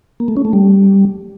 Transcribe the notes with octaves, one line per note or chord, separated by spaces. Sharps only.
A#3
A3
C#4
A3
G3